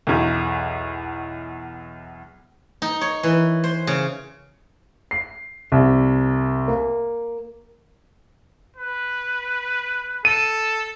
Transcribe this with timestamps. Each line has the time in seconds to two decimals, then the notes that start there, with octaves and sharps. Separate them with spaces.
0.07 B1 E2
2.82 D#4
3.01 C#5
3.23 E3
3.64 C5
3.87 C#3
5.11 C7
5.72 C2
6.68 A#3
8.76 B4
10.25 A4 D#7